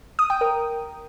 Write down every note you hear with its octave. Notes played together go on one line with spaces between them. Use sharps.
D#6
G5
A#4